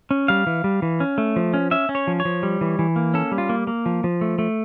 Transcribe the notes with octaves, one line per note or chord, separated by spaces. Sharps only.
C#4
G3 F5
E3
G3
E3
C#4
A3
F3
C#4
C#4 E5
C#4
C#5
F3
C#5
F3
G3
E3
E3
A#3
C#4 A4
G3
F4
A#3
A#3
F3
F3
A3
A3